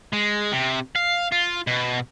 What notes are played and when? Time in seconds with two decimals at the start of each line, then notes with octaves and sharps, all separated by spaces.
0.13 G#3
0.53 C3
0.95 F5
1.32 F4
1.67 B2